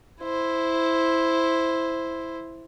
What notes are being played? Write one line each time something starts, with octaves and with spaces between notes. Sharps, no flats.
E4 C5